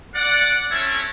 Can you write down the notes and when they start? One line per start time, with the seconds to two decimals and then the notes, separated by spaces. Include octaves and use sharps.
0.15 D5 F#5
0.70 C4 C#4 E4 A4 C#5 E5